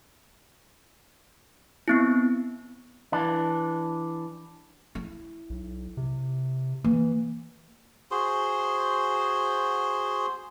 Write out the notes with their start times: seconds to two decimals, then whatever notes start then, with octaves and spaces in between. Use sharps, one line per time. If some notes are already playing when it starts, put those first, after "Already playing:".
1.88 B3 C4 E4
3.12 E3 D4
4.95 E4
5.50 B1
5.97 C3
6.84 E3 A#3
8.11 F#4 G#4 C5 C6